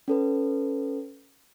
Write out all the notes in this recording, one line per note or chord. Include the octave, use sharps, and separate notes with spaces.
C#4 A4 B4